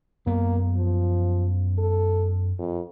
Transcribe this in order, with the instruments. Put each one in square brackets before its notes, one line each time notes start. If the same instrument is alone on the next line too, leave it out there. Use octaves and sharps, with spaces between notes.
[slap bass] F#2 B3 [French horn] A#3
[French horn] F3
A4
F2